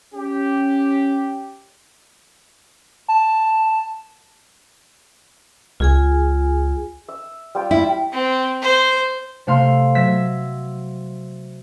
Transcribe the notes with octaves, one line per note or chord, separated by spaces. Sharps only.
C#4 G4
A5
C#2 F4 G#4 G#5
E5
G3 F4 G5
E4
C4
C5
C3 A3 F5 C6
F#3 E5 E6 A#6 B6